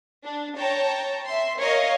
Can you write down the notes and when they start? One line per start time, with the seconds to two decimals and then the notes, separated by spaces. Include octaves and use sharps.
0.23 D4
0.56 C#5 G5 A5 A#5
1.25 E5 C6
1.59 A#4 C#5 D#5 F5